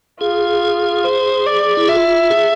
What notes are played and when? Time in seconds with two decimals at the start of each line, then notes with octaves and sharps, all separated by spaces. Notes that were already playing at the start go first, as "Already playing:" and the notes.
0.20 F4 G#4
1.04 C5
1.47 D5
1.77 E4
1.88 F4 E5
2.30 G#4